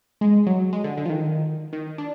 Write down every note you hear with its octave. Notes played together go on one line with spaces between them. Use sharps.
G#3
F#3
G#3
D3
D3
F3
D#3
D#3
D4